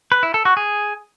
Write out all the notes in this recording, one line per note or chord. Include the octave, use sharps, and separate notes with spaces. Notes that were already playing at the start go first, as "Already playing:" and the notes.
B4
E4
A4
F#4
G#4